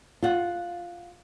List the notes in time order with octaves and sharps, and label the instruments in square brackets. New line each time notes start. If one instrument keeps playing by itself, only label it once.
[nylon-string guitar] F4 F#5